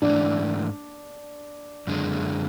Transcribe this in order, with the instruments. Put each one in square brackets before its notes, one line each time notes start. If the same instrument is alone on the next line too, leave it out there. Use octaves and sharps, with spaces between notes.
[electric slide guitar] G#2 E3 A3 [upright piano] D4
[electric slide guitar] F#2 D3 G#3